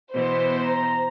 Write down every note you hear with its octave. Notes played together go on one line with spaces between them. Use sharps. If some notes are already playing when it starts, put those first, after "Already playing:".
B2 E3 B3 C5
A#5